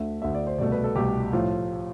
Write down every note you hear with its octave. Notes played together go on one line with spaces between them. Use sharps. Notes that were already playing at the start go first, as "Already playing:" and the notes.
Already playing: D2 D3 A3 E5
D2 D3 A3 E5
D5
C5
C2 B2 A3 D5
B4
A4
C2 B2 A3 G4
A2 F3 A3 F4